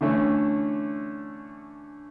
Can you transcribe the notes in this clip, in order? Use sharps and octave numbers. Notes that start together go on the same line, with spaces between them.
D3 E3 A3 C#4